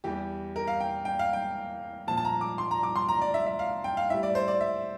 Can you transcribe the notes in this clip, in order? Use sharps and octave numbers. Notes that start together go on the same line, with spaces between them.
E2 E3 G3 G4
A#4
F5
G5
G5
F5
G5
A#2 F3 A5
A5
A#5
D6
C6
A#5
D6
C6
A#5
D5
E5
E5
F5
G5
F5
A2 G3 E5
D5
C5
D5
E5